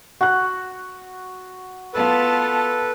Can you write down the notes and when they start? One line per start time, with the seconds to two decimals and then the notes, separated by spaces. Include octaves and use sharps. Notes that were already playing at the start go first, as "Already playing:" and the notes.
0.21 F#4 F#5 F#6
1.94 B3 F4 A4 B4 A5